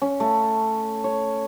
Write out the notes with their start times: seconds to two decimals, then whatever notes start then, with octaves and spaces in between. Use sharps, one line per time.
0.02 C#4
0.20 A3
1.04 C#5